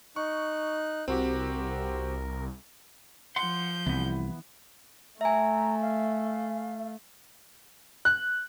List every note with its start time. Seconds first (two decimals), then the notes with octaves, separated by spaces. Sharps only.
0.16 D#4 C#6 F#6
1.08 C2 C4 F#4 G4 A#4
3.36 F3 F#5 C6 G6
3.86 C2 E3 B3
5.21 A3 E5 G#5 A#5
5.81 F5
8.05 F#6